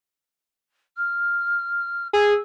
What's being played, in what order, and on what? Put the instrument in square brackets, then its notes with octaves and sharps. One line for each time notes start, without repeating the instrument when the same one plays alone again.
[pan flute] F6
[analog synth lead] G#4 [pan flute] E6